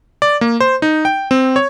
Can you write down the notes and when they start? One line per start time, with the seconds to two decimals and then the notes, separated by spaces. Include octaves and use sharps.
0.22 D5
0.41 A#3
0.60 C5
0.82 D#4
1.05 G5
1.31 C4
1.56 C#5